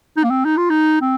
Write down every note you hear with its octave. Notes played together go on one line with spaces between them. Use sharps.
D#4
A#3
C4
D#4
F4
D#4
C4